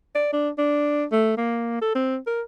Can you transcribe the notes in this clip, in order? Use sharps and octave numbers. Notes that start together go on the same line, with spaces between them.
D5
D4
D4
A3
A#3
A4
C4
A#4